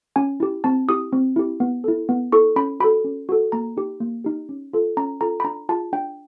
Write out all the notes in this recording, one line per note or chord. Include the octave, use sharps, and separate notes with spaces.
C#4 G#5
E4 G4
C4 A5
E4 G4 D#6
C4
E4 G4
B3
E4 A4
B3
E4 A4 C#6
C#4 B5
F#4 A4 B5
C#4
F#4 A4
A#3 A#5
D#4 G4
A#3
D#4 G4
C#4
F4 A4
C#4 A#5
F4 A4 A#5
B5
D4 A#5
F4 G#4 A5
D4 G5